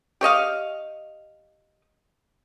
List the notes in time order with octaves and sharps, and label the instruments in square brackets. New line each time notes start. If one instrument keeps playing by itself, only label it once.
[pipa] G4 C#5 D#5 F5